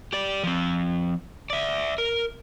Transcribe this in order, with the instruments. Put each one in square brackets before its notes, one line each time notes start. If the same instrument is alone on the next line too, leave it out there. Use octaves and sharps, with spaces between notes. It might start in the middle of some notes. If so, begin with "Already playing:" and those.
[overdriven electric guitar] G4 D5
F3 C4
D5 E5
A#4